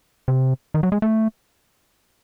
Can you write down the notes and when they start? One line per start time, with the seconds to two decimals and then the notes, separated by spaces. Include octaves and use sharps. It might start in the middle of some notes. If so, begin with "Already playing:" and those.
0.28 C3
0.74 D#3
0.83 F#3
0.92 G#3
1.02 A3